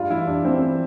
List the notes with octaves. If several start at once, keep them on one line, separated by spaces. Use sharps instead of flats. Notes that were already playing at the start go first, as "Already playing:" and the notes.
Already playing: G2 F4
E3 E4
G2 D4
E3 C4